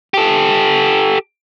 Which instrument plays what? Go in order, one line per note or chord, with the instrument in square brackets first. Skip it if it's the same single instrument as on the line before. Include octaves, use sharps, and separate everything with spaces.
[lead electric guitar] G4 A4